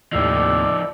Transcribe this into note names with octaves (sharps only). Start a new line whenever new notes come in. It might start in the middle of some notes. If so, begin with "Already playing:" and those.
D#2 A2 C3 F3 D#4 D5 E6